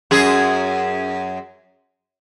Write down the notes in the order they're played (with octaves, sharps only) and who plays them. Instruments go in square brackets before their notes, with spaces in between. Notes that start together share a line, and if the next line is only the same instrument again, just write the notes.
[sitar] F#2 G#4